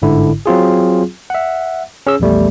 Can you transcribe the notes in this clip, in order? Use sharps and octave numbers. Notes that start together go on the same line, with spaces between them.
G1 G#2 D3 E4
F#3 C4 F4 G#4
E5 F#5
C#4 G#4 E6
A#1 E2 G3 A3